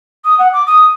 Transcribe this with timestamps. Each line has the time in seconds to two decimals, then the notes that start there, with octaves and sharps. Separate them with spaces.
0.25 D#6
0.39 F#5
0.53 D6
0.67 D#6